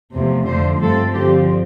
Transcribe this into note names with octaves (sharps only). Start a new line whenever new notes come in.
E2 C3 F3 A3
F2 D3 F3 A3 C5
G2 F3 A3 C4 A4
G2 D3 F3 C4 G4